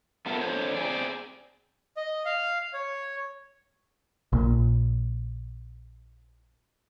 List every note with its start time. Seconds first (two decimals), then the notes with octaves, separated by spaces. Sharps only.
0.26 A3 B3 F4 A4 A#4
0.41 F2 D3 F#3 C5 C#5
0.74 C4 G#4 D5
1.97 D#5
2.25 F5
2.74 C#5
4.33 A#1 A#2